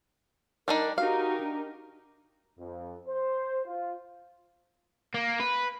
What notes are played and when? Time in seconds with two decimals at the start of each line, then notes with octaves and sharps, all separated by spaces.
0.68 G3 D4 D#4 A#4
0.98 D#4 F#4 G4 A#4 F5
1.40 D4
2.59 F2
3.08 C5
3.66 F4
5.14 A#3
5.40 B4